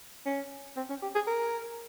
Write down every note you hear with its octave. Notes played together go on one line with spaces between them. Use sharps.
C#4
C4
C#4
G4
G#4
A#4